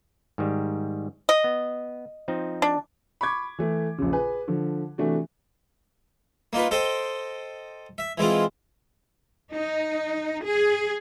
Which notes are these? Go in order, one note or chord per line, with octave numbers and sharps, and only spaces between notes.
G#2 D#3 G3
D#5
B3
F3 C4 D#4
D4
B5 C#6 D6 G#6
E3 A3
A#1 C#3
G#4 B4 G#5
D3 F3
C3 E3 A3 D4 F#4
A#3 D#4 F4 B4
A4 C5 D#5 G5
E5
E3 G#3 C4 F4
D#4
G#4